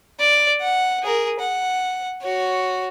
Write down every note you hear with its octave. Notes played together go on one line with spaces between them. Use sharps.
D5
F#5
G#4 A#4
F#5
F#4 C#5